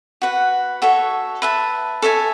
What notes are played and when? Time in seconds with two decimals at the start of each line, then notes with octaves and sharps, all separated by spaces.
0.22 F#4 B4 F#5
0.82 F#4 A4 C#5 E5
1.42 B4 E5 A5
2.02 A4 C#5 E5 G#5